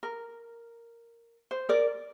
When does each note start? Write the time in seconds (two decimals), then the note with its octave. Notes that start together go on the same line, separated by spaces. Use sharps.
0.03 A#4
1.51 C5
1.69 A#4 D5